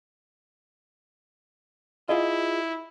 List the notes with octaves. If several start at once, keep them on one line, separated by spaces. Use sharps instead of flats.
E4 F4 G#4 D#5